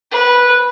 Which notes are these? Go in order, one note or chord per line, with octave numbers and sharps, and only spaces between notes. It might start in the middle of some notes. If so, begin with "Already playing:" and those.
B4